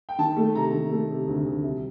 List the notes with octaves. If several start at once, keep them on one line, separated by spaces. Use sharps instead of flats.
G5
D#3 A5
A3
C3 A#5
D#3
A3
C3
D2
D2
C2